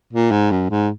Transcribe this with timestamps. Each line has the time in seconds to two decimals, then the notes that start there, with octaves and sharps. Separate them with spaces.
0.13 A#2
0.31 G#2
0.51 F#2
0.70 G#2